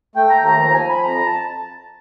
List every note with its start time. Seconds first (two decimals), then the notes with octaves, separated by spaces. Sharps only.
0.15 A3 G5
0.30 A#5
0.37 D#2
0.44 A#5
0.59 F3 A#5
0.74 G#5
0.82 F3
0.89 B5
1.03 F2 A#5
1.26 A5